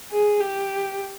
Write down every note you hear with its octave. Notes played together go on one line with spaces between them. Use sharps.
G#4
G4